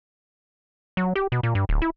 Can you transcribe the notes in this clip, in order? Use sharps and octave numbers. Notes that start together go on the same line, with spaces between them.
F#3
G4
B2
A#2
G2
D1
E4